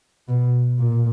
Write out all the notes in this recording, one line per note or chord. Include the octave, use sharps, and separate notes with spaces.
B2
A#2